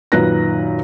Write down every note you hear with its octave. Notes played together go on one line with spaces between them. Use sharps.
F#2 A#2 D#3 B4 F#6 A#6